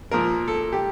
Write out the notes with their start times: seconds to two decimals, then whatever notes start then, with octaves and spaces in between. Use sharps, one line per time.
0.11 A#2 F3 A#3 A#4
0.48 A4
0.73 G4